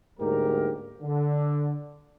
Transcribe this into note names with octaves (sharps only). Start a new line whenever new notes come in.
D2 G#2 G3 A#3 G4 A#4
D3